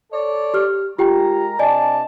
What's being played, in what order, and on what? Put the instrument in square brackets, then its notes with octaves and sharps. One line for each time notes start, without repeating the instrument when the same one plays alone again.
[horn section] A4 C#5 D5
[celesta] G4 F6
[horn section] G#3 A#4 A#5 [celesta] F4 G4 G5
[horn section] C3 D4 A5 [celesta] D5 D#5 G#5